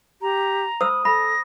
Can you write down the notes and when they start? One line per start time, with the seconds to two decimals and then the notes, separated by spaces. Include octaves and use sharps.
0.22 G4 A#5
0.81 C5 B5 D#6 E6
1.05 A4 B5 A#6